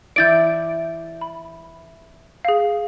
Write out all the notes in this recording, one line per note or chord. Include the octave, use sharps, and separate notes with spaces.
E3 E4 D5 G6 A6 D7
B5
G#4 F5